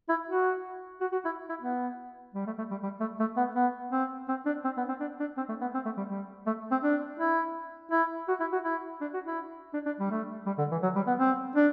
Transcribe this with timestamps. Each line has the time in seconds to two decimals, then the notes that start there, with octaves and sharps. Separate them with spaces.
0.09 E4
0.28 F#4
1.01 F#4
1.12 F#4
1.25 E4
1.49 E4
1.62 B3
2.35 G3
2.47 A3
2.58 A3
2.71 G3
2.83 G3
3.00 A3
3.20 A3
3.37 B3
3.55 B3
3.92 C4
4.29 C4
4.46 D4
4.64 C4
4.77 B3
4.89 C4
5.00 D4
5.20 D4
5.37 C4
5.49 A3
5.61 B3
5.74 C4
5.85 A3
5.97 G3
6.10 G3
6.47 A3
6.71 C4
6.83 D4
7.19 E4
7.91 E4
8.28 F#4
8.40 E4
8.53 F#4
8.64 E4
9.01 D4
9.14 F#4
9.25 E4
9.74 D4
9.86 D4
10.00 G3
10.11 A3
10.46 G3
10.58 D3
10.71 E3
10.83 F#3
10.96 G3
11.07 B3
11.20 C4
11.56 D4